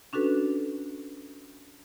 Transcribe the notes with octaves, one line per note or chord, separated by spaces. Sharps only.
C#4 D4 F#4 A4 B4